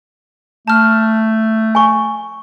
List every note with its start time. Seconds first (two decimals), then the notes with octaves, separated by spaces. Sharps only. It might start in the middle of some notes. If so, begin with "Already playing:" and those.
0.68 A3 A5 F6
1.75 G#5 C#6